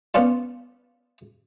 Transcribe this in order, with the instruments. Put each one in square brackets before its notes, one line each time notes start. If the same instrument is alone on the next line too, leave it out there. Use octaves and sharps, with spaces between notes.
[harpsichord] B3 C#4 D4 F4